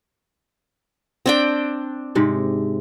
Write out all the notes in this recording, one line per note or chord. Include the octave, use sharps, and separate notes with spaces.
C4 D4 G5
G#2 C3 G#3